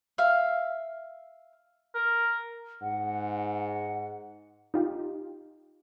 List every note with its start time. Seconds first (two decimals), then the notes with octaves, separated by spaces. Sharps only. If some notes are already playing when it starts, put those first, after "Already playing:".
0.18 E5 F5
1.95 A#4
2.82 G#2 F#5
4.74 D#4 F4 G4